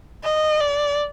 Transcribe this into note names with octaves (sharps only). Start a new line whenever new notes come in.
D#5
D5